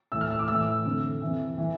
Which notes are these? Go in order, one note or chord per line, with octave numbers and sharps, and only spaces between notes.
A2 E3 E6
F6
E6
D6
A2 E3 E6
F2 D3
F2 E3
E3